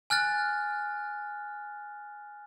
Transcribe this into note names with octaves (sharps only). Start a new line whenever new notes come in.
G#5 F6 F#6 A6